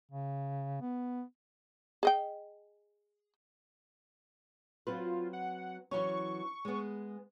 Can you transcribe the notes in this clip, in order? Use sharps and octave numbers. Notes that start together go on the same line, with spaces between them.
C#3
B3
G#4 D#5 G5
F#3 C4 F4 B4
F#5
E3 F#3 C#4 C#6
G#3 B3